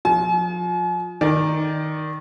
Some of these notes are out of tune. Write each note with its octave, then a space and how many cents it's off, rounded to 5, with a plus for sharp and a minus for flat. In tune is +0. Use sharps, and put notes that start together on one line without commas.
F3 +30 G#5 +45
D#3 +0 D5 +0